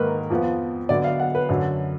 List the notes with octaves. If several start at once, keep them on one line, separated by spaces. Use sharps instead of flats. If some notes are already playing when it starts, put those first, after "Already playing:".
Already playing: G#2 D#3 A#3 A#4 B4
F2 F3 B3
D3 F#3 B3 D5
F5
F#5
B4
F#2 D3 F#3